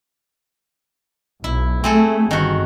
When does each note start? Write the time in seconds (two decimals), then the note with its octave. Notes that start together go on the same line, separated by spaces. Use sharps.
1.44 B1 E4
1.84 A3 C4 G#4 A4
2.31 G1 D#3 F#4